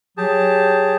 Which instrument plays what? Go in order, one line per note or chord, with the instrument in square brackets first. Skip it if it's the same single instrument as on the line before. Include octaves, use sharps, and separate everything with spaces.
[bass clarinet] F#3 [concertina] G4 G#4 A5